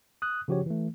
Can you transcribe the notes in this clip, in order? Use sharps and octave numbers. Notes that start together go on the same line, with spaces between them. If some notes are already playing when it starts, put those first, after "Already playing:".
D#6 F#6
C#3 F3 F#4 G4 C#5
E3 A3